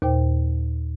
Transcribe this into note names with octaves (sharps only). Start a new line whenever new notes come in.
D#2 A#2 C5 G5